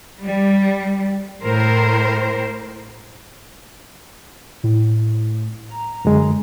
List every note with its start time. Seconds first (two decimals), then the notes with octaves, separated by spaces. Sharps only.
0.23 G3
1.41 A2 A#4 C5
4.63 A2
5.70 A#5
6.05 F#2 D3 G#3